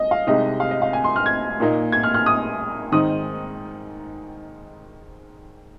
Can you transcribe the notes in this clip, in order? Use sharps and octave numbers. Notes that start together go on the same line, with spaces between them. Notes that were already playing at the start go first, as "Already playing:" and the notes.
Already playing: D#5
F5
C2 C3 G#3 D#4 D#5
F5
D#5
F5
G#5
C6
F6
G#6
A#2 A#3 D#4
G#6
F6
F6
D#6
G#2 D#3 C4 D#4 D#6